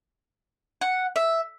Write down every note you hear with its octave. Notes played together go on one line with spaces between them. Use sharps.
F#5
E5